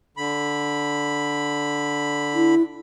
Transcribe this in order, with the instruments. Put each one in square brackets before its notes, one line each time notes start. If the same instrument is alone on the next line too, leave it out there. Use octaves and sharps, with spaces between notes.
[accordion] D3 B5
[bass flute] E4